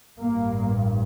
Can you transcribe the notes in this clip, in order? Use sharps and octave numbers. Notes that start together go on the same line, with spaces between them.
A1 G2 A#3